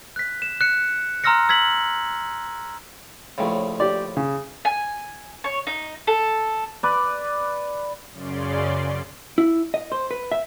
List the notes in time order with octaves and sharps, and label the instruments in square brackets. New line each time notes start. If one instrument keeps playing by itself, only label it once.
[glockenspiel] F#6 B6
E7
F#6 C#7
A#5 C6 E6 F6 A#6 C#7
E6 G#6 B6 F#7
[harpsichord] A#1 A2 C#3
[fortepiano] G4 D5
C#3
[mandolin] G#5
C#5
D#4
A4
[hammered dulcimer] B4 D5
[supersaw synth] F#2 C#3 C#4 D5 C6
[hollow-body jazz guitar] E4
D#5
C5
B4
E5